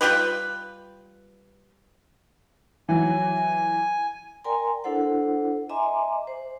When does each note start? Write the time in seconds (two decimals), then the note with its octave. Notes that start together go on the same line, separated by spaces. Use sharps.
0.01 G3 F4 G4 B4
2.89 E3 F#3 G#5
4.44 A#4 D5 G5 G#5 A#5 C6
4.84 D4 E4 A4 C5 F#5
5.69 D#5 E5 G#5 A#5 C6 D6
6.27 C5